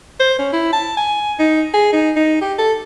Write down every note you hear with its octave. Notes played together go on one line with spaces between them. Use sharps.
C5
C#4
E4
A5
G#5
D#4
G#4
D#4
D#4
G4
A4